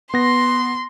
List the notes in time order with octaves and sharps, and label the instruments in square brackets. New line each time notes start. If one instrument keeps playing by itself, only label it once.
[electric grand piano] B3 A#6 [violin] C6